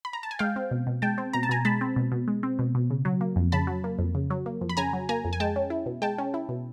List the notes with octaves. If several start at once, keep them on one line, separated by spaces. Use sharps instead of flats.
B5
A#5
A5
G#5
G#3 F5 G5
C4
B2
B2
G#3 G5 A5
C4
B2 A#5
A5
B2 G#5 A#5
G#3 A5 B5
C4
B2
B2
G#3
C4
B2
B2
C#3
F#3
A#3
F2
C#3 A5 B5
F#3
A#3
F2
C#3
F#3
A#3
F2
B5
C#3 G#5 A#5
F#3
A#3 G#5 A#5
F2
G#5
G#3 G5 A5
C#4
E4
B2
G#3 G5 A5
C#4
E4
B2